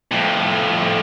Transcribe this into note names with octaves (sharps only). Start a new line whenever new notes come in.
F2 A2